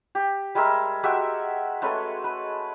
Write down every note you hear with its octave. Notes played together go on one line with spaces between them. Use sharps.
G4
G3 G#3 A#4 E5
G#3 F#4 G4 E5
G#3 A3 C#4 B4
B4